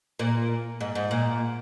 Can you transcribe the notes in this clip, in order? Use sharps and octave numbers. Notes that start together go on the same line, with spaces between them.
A#2
G#2
G#2
A#2